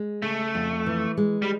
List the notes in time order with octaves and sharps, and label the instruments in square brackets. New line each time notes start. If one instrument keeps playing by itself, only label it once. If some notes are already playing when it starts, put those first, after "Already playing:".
Already playing: [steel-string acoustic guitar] G#3
[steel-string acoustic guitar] C#3 [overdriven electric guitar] A3
[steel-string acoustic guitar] F2
E3
G#3
[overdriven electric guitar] G3